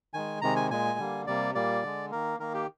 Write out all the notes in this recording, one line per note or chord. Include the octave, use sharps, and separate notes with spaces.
D#3 G#3 G#5
C3 D#3 G#3 A#5
G#5
A#2 G#3 G#5
D3 G3 A#3
C3 G3 A#3 D5
A#2 G3 A#3 D5
D3 G#3
D#3 A#3 A#4
D#3 A#3 A#4
G4